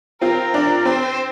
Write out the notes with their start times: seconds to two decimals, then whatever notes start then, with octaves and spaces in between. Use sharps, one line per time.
0.21 C4 F4 A#4
0.54 D4
0.85 C4 C5